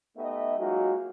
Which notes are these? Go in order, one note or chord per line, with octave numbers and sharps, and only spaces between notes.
A3 B3 D#4 G4 D#5 E5
F#3 G#3 A#3 D#4 F4 F#4